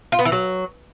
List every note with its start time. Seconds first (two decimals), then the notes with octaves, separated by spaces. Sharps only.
0.12 F4
0.19 B3
0.25 E3
0.32 F#3